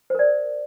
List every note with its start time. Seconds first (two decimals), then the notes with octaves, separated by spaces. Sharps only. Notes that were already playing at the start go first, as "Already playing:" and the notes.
0.10 C5
0.15 A#4
0.19 D5